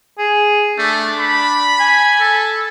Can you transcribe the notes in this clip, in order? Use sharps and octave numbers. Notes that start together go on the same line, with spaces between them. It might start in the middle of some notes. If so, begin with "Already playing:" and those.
G#4
A3 D4
B5
G#5
A4